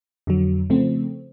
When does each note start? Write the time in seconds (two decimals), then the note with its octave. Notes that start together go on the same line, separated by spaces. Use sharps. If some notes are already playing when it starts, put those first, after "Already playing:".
0.27 F2 D3 F#3
0.70 C#3 F3 A3 C4